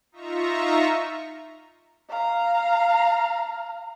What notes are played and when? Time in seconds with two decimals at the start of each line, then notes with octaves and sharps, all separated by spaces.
0.12 D#4 F4 E5 A#5 C#6
2.09 F5 A#5